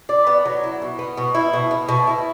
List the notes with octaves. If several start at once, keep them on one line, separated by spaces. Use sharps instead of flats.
D5
B3
F#3
E4
B2
B3
B2
E4
B2
B3
B2
E4